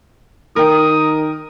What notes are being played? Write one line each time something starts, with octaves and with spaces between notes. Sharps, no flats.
D#3 A#4 G5 D#6